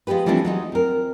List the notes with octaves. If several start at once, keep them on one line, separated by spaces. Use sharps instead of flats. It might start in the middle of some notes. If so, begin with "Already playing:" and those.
F3 G#3 B3 G4 B4
E3 F3 G3 A3 C4 D4
F#3 G#3 D#4
C4 A#4